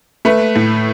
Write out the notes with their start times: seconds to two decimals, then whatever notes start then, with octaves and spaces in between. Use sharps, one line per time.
0.25 A3 B4
0.56 A2